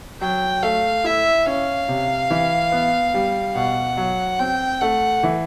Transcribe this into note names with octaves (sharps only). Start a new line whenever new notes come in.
F#3 G5
A3 F5
E4 E5
C#4 F5
C3
E3
B3
G3
B2 F#5
F#3
C4 G5
A3 F#5
E3